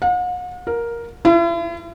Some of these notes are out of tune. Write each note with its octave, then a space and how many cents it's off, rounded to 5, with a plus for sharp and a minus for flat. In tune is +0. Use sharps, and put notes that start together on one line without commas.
F#5 -45
A#4 +5
E4 +45